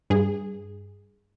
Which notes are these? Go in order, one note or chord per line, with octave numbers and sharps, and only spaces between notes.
G2 G#4